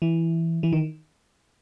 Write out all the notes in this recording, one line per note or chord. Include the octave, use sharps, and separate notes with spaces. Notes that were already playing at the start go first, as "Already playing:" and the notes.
E3
E3
D#3